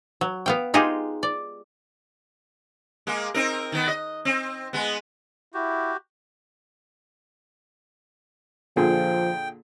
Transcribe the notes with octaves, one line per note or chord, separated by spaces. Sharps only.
F#3
B3 F5 G5
G#3 D#4 F4 G4 G#4
D5
G#3 A#3
C4 D#4 A#4
D#3 B3
D#5
C4
G#3 B3
E4 F#4 G4
A#2 D3 F3 G#4 G5